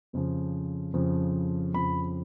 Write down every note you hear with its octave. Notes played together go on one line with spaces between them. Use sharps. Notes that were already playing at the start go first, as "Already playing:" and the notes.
F2 C#3 F3
F2 C#3 F3
F2 C#3 F3 B5